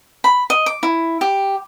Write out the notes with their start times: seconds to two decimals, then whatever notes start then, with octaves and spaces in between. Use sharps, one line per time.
0.24 B5
0.50 D#5
0.66 D6
0.83 E4
1.21 G4